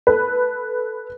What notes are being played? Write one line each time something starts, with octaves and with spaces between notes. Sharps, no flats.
A4 B4